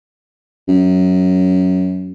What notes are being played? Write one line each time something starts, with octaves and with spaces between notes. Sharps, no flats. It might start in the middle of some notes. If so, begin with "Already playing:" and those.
F#2